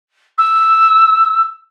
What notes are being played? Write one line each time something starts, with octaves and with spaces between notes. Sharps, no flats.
E6